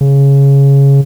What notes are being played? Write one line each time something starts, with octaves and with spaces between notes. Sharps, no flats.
C#3